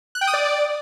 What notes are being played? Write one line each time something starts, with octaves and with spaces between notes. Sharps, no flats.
F#6
G5
D#6
D5